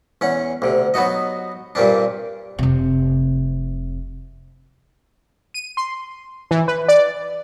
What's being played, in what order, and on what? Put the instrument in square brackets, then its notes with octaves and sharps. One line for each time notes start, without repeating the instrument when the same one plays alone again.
[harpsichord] E2 C#4 F#5
D2 C3
F#3 B3 D#4 F#4 D#5
G2 A#2 A#3 C4 D4
[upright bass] F1 C3
[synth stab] D#7
C6
E3
B4
D5